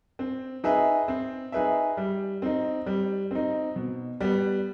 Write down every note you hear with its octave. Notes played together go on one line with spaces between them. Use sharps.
C4
D#4 G#4 B4 E5
C4
D#4 G#4 B4 E5
G3
C4 D#4
G3
C4 D#4
B2
G3 B3